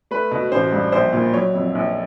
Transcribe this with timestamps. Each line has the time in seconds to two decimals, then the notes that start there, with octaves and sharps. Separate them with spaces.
0.11 A3 B4
0.31 B2
0.52 A1 C5
0.73 G2
0.92 A#1 C5
1.13 A#2
1.33 F#3 C#5
1.54 F2
1.75 A#1